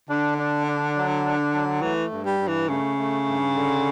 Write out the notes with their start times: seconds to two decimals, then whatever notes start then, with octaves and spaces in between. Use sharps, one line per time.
0.09 D3 D4
0.38 D4
0.67 D4
0.96 F#3
1.25 D4
1.54 F#3
1.82 E3 A3
2.11 G2
2.26 G3
2.40 G2
2.47 E3
2.69 C#3 A3
2.98 A3
3.27 G2
3.55 D3